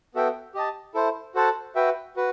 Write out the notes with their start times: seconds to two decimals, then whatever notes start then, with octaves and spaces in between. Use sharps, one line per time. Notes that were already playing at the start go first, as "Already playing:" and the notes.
0.15 B3 F#4 A4 E5 G5
0.54 G4 D#5 A5
0.94 E4 A4 C5
1.35 F#4 A4 C5 F#5 A5
1.75 F#4 B4 E5 G5
2.16 F#4 B4